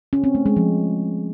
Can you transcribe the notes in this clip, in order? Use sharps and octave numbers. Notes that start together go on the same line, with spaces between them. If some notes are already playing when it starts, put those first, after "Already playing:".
C#4
C4
A3
G#3
F3